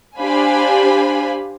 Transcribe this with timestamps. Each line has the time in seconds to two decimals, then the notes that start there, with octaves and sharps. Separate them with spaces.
0.20 D4 G4 C5 F5 G#5 B5